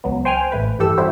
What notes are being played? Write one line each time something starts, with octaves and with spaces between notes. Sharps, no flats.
C#2 F#3 B3
C5 G5 G#5 F6
A1 A3 B4
G2 E3 G4 A4 E6
E3 G3 C4 E4 F#4 C5